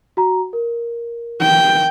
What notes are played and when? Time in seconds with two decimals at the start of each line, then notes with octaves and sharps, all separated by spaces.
0.17 F#4 A#5
0.53 A#4
1.41 G5